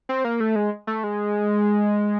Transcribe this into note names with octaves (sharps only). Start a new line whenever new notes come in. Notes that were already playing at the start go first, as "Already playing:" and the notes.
C4
A#3
A3
G#3
A3
G#3